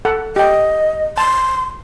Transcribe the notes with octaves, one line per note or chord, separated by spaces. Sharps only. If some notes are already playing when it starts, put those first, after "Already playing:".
A4 F#5
G4 D#5 G5
A5 C6